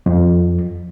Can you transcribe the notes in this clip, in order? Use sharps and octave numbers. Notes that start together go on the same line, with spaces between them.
F2